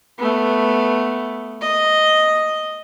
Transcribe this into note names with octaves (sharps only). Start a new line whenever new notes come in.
A3 B3
D#5